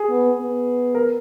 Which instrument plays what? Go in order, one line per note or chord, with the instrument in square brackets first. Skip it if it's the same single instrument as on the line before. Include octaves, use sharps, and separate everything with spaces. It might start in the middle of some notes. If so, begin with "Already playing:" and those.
Already playing: [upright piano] G#4
[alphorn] B3
B3
[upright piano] A#4